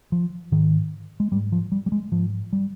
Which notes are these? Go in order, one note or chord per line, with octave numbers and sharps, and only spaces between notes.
F3
G#2 D#3
G#3
G#2 G3
F3
G3
G3
G#3
G#2 F3
G3